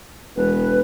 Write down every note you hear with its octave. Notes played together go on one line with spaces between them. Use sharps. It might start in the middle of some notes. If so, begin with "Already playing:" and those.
E1 B4